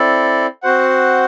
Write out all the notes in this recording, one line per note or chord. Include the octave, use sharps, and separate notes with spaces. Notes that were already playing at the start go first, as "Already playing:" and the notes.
Already playing: C4 E4 A4 D5
C4 F#4 C5 F#5